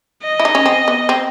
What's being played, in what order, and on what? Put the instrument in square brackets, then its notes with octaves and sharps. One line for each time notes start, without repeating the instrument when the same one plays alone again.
[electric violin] D#5
[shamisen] E4
D#4
C#4
C4
B3
C4